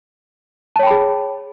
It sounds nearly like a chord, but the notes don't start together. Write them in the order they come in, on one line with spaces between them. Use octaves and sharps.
A5 C#5 G5 B5 G#4